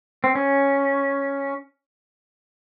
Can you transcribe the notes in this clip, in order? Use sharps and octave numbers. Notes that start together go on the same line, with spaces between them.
C4
C#4